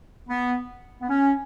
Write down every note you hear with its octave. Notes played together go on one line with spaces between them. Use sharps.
B3
B3
C#4